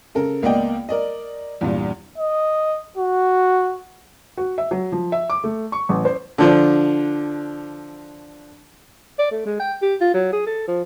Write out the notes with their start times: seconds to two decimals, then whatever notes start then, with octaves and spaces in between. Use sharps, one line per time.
0.15 C#3 A4 A#4
0.42 C#2 A#3 B3 D5 D#5 G5
0.89 A#4 D5 D#5
1.61 E2 G2 A#2
2.18 D#5
2.97 F#4
4.37 F#4
4.58 E5
4.71 F#3
4.92 F3
5.12 E5
5.30 D6
5.44 A3
5.72 C#6
5.89 A1
6.05 C5
6.38 D3 F3 D4
9.18 D5
9.31 A3
9.45 G#3
9.59 G5
9.82 G4
10.01 F4
10.14 F#3
10.32 G#4
10.46 A4
10.68 F3